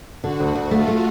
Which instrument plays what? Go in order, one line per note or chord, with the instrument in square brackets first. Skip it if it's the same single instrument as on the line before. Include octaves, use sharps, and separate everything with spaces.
[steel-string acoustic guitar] D3 [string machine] F#4
[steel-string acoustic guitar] D2
D2
[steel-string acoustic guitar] A3 [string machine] F4
[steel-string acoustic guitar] A3